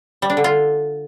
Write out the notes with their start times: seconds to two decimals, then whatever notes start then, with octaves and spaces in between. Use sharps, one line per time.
0.22 G3
0.30 D4
0.37 D3
0.44 F4